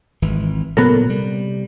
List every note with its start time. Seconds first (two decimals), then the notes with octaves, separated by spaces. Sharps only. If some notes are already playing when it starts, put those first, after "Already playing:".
0.22 G#1 E3
0.77 A#2 C#3 F#3 B3 A4 A#4
1.06 C3 G3